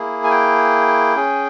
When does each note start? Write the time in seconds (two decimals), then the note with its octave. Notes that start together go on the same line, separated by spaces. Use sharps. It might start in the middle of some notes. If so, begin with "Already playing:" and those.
Already playing: A#3 E4 G#4
0.24 G#5
0.31 G5
1.16 C#4 G#4